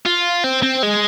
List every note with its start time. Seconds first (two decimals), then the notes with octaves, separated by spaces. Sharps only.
0.06 F4
0.44 C4
0.63 C4
0.83 G#3